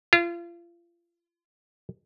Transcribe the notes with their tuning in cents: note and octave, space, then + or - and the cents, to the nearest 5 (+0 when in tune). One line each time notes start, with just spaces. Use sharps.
F4 -35